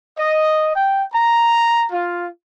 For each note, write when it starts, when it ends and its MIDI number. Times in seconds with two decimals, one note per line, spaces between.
0.17 0.74 75
0.75 1.03 79
1.13 1.85 82
1.91 2.26 65